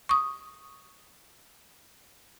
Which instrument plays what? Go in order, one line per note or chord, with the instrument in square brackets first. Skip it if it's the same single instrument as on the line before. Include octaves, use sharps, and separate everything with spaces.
[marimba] C#6 D#6